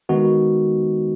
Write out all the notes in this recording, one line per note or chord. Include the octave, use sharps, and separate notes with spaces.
D#3 G#3 B3 D#4 F#4